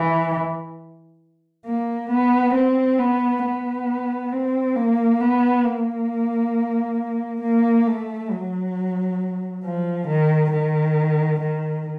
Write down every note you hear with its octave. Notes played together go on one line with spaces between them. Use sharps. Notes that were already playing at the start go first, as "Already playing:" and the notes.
Already playing: E3
A#3
B3
C4
B3
B3
C4
A#3
B3
A#3
A#3
A3
F#3
F3
D#3
D#3
D#3